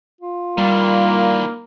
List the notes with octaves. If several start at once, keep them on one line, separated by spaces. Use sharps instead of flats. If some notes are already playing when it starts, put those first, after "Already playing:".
F4
D#3 E3 G3 A#3